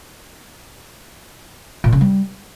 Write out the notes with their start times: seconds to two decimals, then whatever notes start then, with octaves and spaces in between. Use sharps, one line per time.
1.84 A#2
1.92 C#3
2.01 G3